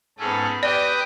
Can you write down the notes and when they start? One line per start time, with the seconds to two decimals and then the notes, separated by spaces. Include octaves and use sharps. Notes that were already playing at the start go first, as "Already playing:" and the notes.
0.18 G#2 B3 C#4 G#4 A4
0.63 G4 B4 D5 G5 D#6